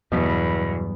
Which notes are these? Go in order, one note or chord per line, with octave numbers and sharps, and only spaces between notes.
E2 G2 B2 F#3 G3